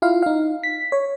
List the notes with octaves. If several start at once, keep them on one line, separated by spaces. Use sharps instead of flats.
E4 F4 F5
D#4 F5
B6
C#5